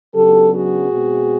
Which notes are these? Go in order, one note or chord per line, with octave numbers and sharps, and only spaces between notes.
C#3 F#3 B3 D4 G4 A4
F#4 G#4
B2 G#3 C4